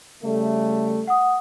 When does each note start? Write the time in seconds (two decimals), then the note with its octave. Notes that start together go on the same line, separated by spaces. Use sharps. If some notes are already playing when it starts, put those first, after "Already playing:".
0.23 C#3 G3 A3
1.07 F#5 D#6